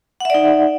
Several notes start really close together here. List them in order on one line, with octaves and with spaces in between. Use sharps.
F#5 E5 D5 D#4